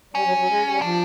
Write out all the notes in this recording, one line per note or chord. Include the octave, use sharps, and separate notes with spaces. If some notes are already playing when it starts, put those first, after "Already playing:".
G3 C#4
F#3
F#3
G#3
G3
F3 D4